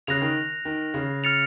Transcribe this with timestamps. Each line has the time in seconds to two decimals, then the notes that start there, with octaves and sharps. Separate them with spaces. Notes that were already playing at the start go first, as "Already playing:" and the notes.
0.07 C#3 F#6 A#6 F7
0.22 D#3
0.65 D#3
0.94 C#3
1.24 F6 A6 C#7 F7